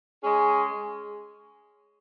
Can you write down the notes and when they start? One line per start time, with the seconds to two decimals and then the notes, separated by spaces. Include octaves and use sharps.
0.23 G#3 C#4 G#4